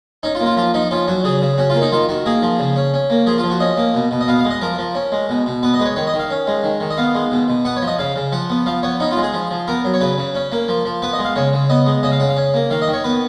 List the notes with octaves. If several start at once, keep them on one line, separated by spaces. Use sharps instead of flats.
C#4 D#4
F4
A#3
F4
F3 F4
F3 D#4
C#4 F4
F#3 F#4
C#3 G#4
C#3
C#4 F#4
F4
A#3
D#4
D#3 F4
D#3 F#4
A#3 G#4
F3
C#3
C#4
C#4
A#3
F3 G#4
F4
F3
F#4
C#4 D#5
A#3
B2
B2
D#5
B3 F5
F5
G#3
D#5
F3 A#4
F3
C#4
G#3
B2
B2
B3 B4
D#5
G#3 B4
C#5
D#3 C#5
D#5
D#3
F5
C#4
G#3
D#3
D#3
D#5
B3 F5
G#3
B2
B2
B3 F#5
C#5
F3
D#5
C#3 F5
C#3
F3 F#5
B3
F3 F5
B3 C#5
C#4 D#4
F4
G#3
G#4
F3
F3
B3 A#4
F#3
C#5
C#3 B4
C#3
C#4
A#3
F3
F3
B3 B4
D#5
G#3
F5
C#3 C#5
C#3
B3 D#5
G#3
C#3 D#5
F5
C#3 F#5
F5
C#4
A#3
D#3 F5
D#5
D#3
C#5
B3 B4